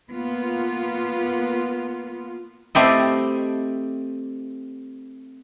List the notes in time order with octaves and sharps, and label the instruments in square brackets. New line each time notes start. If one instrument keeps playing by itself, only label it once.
[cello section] A#3 B3 F4
[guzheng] A3 C4 E4 G4 A4 D#5